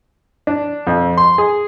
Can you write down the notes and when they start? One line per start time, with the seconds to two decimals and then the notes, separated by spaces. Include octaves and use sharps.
0.47 D4
0.87 F2
1.17 C6
1.38 G#4